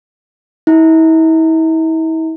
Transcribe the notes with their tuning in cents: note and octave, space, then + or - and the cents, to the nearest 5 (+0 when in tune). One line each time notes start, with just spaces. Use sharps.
E4 -40